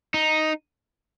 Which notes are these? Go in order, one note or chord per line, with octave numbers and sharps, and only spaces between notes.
D#4